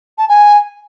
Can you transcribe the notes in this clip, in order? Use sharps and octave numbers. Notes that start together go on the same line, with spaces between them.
A5
G#5